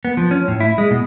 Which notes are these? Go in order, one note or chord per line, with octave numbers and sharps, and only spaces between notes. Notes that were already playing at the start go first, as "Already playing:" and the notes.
B3
F3
C#4
A2
E4
G#3
B2